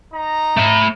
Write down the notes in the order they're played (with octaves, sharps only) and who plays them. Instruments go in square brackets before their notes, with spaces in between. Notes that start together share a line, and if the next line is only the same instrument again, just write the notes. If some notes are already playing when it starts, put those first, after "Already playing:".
[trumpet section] D#4 A#5
[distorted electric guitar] A3 B5